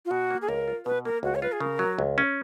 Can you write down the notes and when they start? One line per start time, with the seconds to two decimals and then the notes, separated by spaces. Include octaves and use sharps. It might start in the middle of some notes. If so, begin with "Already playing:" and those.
0.05 F4
0.11 B2 F#4
0.30 A#3
0.42 G#4
0.49 C#2 A#4
0.68 F4
0.85 B2 B4
1.05 A#3 A#4
1.23 C#2 F#4
1.35 C#5
1.42 F4 B4
1.52 G#4
1.60 C#3 A#4
1.79 F#3
1.99 C#2
2.18 C#4